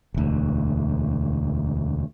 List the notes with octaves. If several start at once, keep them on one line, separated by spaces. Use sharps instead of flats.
E1 D2